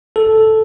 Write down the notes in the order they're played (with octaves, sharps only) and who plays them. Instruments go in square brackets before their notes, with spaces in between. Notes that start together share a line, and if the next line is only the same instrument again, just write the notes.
[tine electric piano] A4